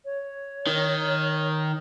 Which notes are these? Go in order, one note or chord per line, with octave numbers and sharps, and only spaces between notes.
C#5
D#3